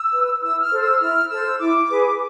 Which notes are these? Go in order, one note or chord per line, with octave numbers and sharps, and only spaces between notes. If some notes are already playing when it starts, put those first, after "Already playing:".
Already playing: E6
B4
E4 E6
F6
A4 C5
E6
E4 F6
A4 C5 E6
E4 D6
G#4 B4